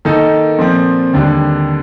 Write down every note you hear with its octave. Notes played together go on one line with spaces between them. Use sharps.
D#3 A#3 D#4 A4
A#2 F3 C4
D#2 D3 G3 D4